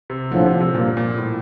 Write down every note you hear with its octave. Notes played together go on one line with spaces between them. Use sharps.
C3
A#1 A2 D3 F3
C3
C3
G2 A#2 F3 A#3
A#2
A2